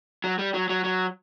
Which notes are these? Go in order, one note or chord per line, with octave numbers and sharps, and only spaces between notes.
F#3
G3
F#3
F#3
F#3